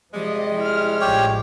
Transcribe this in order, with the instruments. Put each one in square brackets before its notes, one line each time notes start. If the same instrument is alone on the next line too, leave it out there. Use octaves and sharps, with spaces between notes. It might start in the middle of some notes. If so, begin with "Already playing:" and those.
[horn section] C3 G3 G#3 [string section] F3 G4 D#5
[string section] E4 F6
[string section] A1 F3 [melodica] G4 C#5